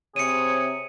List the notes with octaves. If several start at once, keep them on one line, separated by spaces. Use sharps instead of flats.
C3 G#4 C#5 C#7 D#7